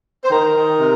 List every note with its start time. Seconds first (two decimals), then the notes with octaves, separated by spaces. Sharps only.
0.24 C5
0.30 D#3 A#4
0.55 D#3
0.80 C3